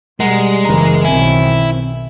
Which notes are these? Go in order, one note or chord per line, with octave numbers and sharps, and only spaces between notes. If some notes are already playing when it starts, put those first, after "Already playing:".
B2 G3 G#3 A#4 F#5 A#5
F#1 E3 A#5
B1 D#3 C4 E4 G#5